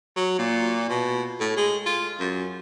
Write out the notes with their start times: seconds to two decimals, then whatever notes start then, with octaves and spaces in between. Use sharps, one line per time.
0.16 F#3
0.39 A#2
0.89 B2
1.40 A2
1.57 G#3
1.86 F4
2.19 F#2